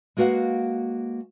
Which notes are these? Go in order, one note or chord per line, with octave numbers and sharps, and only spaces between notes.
G#3 A#3 F#4 B4 F5 F#5